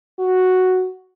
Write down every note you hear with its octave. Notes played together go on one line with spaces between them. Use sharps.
F#4